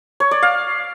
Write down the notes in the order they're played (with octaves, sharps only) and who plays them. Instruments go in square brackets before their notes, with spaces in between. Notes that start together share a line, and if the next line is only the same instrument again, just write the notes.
[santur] C#5
D5
F5